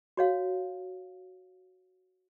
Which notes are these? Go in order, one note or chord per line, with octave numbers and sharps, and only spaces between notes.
F#4 C#5 F5